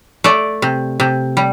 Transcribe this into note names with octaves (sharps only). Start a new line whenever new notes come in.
A3 D5
C3
C3
G3